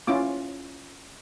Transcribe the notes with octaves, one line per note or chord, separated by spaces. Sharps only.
C#4 E4 F4 D6